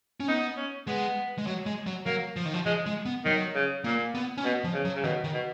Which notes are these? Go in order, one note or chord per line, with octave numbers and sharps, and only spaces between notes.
C#4
B3 D#4
C#4
G#3 B3
G#3
F#3
G#3
F#3
F#3 A#3
F3
D#3
F3
F3 G#3
G#3
B3
D#3 F#3
C#3
A#2 A#3
B3
C#4
B2 B3
F3
C#3
F#3
C#3
B2 D#3
D#3
B2